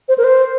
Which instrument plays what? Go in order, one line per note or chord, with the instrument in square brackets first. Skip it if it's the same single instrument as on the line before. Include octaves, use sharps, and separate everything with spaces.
[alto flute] C5
A#4
C5